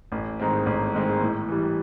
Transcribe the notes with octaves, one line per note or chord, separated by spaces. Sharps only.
A1
G#2 D#3 G#3 C4
A1
G#2 D#3 G#3 C4
A2
E3 G3